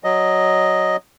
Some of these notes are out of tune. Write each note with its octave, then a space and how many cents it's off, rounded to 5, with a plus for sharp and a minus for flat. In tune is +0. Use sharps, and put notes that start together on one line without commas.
F#3 +5 D#5 +0